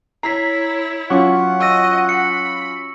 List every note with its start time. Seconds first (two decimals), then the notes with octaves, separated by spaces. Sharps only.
0.23 E4 C#5 A#5 B6 C7
1.10 F#3 C#4 F4 F#5 C#6 D6
1.60 D#5 C#6 E6 A#6
2.09 B5 C#7